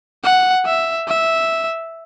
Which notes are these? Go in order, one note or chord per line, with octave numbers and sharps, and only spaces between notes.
F#5
E5
E5